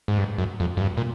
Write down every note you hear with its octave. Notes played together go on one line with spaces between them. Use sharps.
G#2
G2
F#2
F2
F#2
G2
A#2